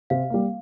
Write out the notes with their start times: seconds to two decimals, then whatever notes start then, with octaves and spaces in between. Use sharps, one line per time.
0.10 C3 F5
0.30 G3 A#3